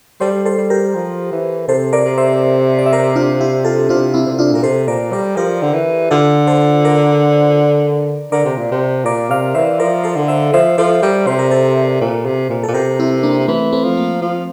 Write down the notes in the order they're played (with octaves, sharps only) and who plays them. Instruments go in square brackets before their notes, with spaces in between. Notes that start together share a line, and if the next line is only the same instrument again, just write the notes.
[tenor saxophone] G3 [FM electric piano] A4 C5
[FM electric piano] A4 C5
[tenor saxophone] G3
[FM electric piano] G4 A#4
[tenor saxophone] F3
E3
[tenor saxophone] C3 [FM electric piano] A4 C5
[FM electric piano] A#4 D5
[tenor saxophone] C3
[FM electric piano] C5 E5
D5
E5
A#4 D5
D4 F4
E4 G4
F4 A4
[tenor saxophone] C3 [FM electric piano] D4 F4
[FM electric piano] C4 E4
[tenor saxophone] C3
[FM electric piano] D4 F4
[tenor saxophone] A#2 [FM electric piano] A#4
[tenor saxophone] C3 [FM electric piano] A4 C5
[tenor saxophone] A#2 [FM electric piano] A#4 D5
[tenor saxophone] G3 [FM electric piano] A#4 D5
[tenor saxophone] F3 [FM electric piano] G4 A#4
[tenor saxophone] D3
E3
[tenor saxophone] D3 [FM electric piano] F4 A4
[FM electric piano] A4 C5
A#4 D5
[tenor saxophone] D3 [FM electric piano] A#4 D5
[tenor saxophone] C3
A#2
C3
[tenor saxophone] A#2 [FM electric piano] A#4 D5
[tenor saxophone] C3 [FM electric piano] D5 F5
[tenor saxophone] E3 [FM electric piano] C5 E5
[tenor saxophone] F3 [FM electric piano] A#4 D5
[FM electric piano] A4 C5
[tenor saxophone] D3
[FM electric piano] C5 E5
[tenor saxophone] F3 [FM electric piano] C5 E5
[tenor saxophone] F3 [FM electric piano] A4 C5
[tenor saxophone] G3 [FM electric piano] A#4 D5
[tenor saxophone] C3 [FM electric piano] C5
[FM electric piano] A#4
A4 C5
[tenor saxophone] A#2
C3
A#2
[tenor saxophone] A#2 [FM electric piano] A4
[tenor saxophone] C3 [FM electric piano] G4 A#4
[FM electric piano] C4 E4
A#3 D4
[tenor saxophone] E3 [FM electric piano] A3 C4
[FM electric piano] A3 C4
[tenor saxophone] F3
[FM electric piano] A#3
[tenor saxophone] F3